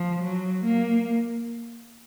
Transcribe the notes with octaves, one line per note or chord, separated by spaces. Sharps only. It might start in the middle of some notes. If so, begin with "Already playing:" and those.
Already playing: F3
F#3
A#3